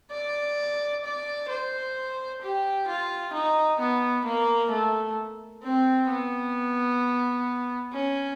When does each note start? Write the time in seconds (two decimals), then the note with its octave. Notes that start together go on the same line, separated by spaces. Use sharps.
0.12 D5
1.05 D5
1.50 C5
2.42 G4
2.88 F4
3.33 D#4
3.80 B3
4.25 A#3
4.71 A3
5.63 C4
6.09 B3
7.93 C#4